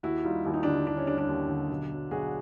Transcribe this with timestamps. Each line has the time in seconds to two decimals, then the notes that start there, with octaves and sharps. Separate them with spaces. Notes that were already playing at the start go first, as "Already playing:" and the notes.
0.03 D#2 E4 F#4
0.24 G3 D#4 F4
0.45 D#2 E4
0.54 D#4
0.63 D3 D4 E4
0.87 D#2 D4
0.97 C#4
1.07 G3 D4
1.18 D4
1.28 D#2
1.49 D3
1.70 B1
1.91 F#3
2.11 B1 F#4 G#4